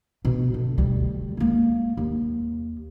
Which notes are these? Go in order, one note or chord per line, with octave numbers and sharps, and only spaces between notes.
B2
D3
D2 G3
G#3 A#3
D#2